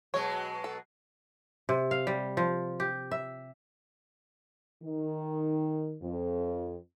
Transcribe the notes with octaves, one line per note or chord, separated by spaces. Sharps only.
B2 F#3 G#3 C#5
A4
C3
F5
G3
F3
G4
E5
D#3
F2